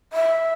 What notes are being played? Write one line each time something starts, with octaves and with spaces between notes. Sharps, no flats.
E5